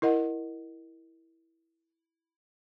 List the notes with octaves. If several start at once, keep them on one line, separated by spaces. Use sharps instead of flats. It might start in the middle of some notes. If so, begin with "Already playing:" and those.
E4 A#4 D#5 F#5